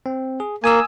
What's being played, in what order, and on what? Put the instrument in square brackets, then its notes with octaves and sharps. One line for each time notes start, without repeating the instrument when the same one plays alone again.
[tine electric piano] C4
G#4
[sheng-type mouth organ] A#3 [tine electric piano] G#5 D#6 E6